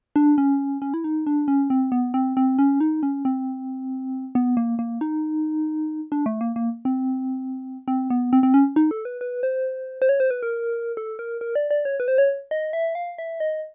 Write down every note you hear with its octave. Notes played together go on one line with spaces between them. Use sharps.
D4
C#4
C#4
E4
D#4
D4
C#4
C4
B3
C4
C4
C#4
D#4
C#4
C4
B3
A#3
A#3
D#4
D4
A3
A#3
A#3
C4
C4
B3
C4
C4
C#4
D#4
A4
B4
B4
C5
C5
C#5
C5
B4
A#4
A4
A#4
A#4
D5
D5
C#5
B4
C5
C#5
D#5
E5
F5
E5
D#5